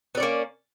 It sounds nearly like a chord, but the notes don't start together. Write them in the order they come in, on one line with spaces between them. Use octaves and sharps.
B3 D5 C#4 A#3